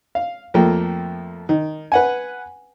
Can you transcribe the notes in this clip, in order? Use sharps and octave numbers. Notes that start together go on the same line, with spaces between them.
F5
F2 F3 A3 A#3 G5
D#3
B4 F#5 G#5